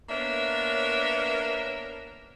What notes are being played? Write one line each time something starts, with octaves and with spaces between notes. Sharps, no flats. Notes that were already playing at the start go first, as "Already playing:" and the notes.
A#3 B3 D4 A#4 C#5 E5